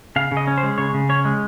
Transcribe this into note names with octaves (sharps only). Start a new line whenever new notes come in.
C#3 F5
C#3
D#5
C#4
C5
G#3
C#3 C#5
C#3
C#4 C#5
G#3